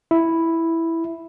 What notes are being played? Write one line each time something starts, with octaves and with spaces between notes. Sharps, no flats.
E4